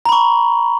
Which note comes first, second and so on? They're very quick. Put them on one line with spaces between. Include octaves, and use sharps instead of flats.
A#5 B5 C#6